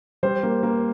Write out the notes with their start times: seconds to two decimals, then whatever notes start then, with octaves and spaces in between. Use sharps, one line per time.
0.23 G3 C5
0.43 A#3
0.63 A#3